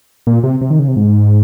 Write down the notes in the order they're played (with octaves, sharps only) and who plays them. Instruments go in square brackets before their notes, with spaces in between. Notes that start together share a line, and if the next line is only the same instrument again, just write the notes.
[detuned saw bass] A#2
C3
C3
D#3
C#3
C3
G#2